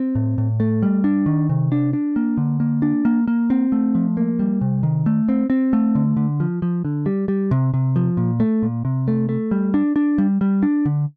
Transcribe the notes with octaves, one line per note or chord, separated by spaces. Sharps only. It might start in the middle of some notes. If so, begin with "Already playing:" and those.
Already playing: C4
A2
A2
A3
G3
D4
D#3
C3
D4
D4
A#3
D3
A#3
D4
A#3
A#3
C4
A3
F3
A#3
G3
C3
D#3
A3
C4
C4
A3
D3
D3
F3
F3
D3
G3
G3
C3
C3
F3
A#2
A3
A#2
C3
A3
A3
G3
D4
D4
G3
G3
D4
D3